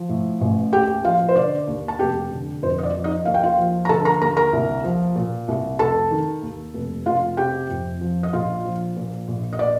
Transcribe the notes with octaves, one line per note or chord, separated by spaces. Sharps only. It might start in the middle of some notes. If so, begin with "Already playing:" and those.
Already playing: F3
A2
A1
D#2 G4 G5
F3 F4 F5
C5
D3 D5
D#2
A5
F1 G4 G5
D3
F2 C5
D#5
D5
F3
D#4 D#5
D#2 F5
G5
F4 F5
F3
A#5
D3 A4 A5
A#4 A#5
D#2 A#4 A#5
A#4 A#5
C2
F3
A#2
C2
F1 A4 A5
D#3
D#2
F1
F1 F4 F5
C3 G4 G5
F2
F3
D#5
A#1 F4 F5
F3
A#2
A#1
D#5
D5